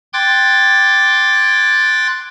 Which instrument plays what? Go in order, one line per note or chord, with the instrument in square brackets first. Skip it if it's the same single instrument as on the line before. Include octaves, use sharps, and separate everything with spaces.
[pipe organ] G5 C6 D6 F#6 G#6 A6